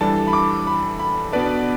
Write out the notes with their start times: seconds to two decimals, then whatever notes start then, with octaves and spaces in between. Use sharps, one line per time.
0.01 E3 G3 D4 A4 A5
0.27 B5
0.33 D6
0.67 B5
0.99 B5
1.33 B2 B3 D4 B4 D5 A5